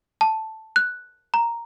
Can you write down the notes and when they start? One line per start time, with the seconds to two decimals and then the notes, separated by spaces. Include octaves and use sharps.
0.21 A5
0.76 F#6
1.34 A#5